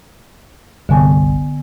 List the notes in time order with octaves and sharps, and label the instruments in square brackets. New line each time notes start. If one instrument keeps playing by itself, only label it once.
[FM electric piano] G1 C2 [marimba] D3 B3 G#5